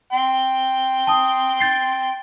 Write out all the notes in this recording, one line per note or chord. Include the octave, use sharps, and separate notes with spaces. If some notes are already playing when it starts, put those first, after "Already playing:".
G5 C6
A5 D#6
G6 A6 C7